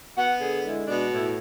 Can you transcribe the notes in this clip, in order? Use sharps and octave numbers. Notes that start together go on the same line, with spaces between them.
B3 F#5
D3 G#4
G#3 E4
B2 D4
A2 E4